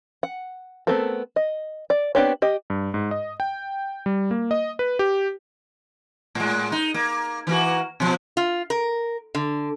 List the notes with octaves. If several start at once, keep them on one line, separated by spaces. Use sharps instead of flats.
F#5
A3 B3 C4 A4 A#4
D#5
D5
B3 C4 D4 G4 C#5
G4 D#5
G2
G#2
D#5
G5
G3
A#3
D#5
B4
G4
A2 G#3
D#4
A#3
E3 A#3 F#4
B2 F3
F4
A#4
D3